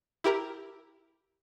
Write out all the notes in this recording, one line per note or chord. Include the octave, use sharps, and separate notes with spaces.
E4 G4 A#4 A#5